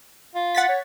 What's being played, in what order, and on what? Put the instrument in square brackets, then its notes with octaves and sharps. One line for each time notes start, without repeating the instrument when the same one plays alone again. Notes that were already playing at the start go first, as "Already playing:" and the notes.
[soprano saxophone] F4
[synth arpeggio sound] F#5 A6 B6
[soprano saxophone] C#5